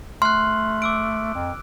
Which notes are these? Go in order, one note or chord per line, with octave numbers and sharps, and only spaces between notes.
A3 C6 F6 F#6
D6 E6 D7
F2